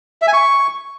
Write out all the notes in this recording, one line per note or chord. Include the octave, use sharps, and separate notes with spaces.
E5
G#5
C#6